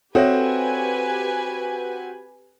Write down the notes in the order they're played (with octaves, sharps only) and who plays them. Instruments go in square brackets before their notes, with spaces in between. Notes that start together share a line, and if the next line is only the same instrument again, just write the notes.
[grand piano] C4 F#4 [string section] G4 B4 G#5 [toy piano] A4 C#5 E5